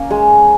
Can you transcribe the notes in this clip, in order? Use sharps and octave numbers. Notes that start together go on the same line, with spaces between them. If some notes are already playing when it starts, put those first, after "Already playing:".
Already playing: A#3 C#4
G#3